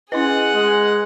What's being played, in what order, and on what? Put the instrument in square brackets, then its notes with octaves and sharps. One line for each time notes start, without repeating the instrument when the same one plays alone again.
[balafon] C#4 E4 D#5 [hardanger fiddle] G#4 F#5 [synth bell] B4 C6
[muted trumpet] G#3